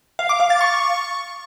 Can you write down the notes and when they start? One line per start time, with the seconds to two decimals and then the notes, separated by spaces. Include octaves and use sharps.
0.19 F5
0.29 D6
0.40 F5
0.50 A6
0.61 C#6